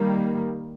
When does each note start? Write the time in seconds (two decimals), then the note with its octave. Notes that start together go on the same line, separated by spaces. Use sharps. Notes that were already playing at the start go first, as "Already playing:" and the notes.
Already playing: D#3 G3 A#3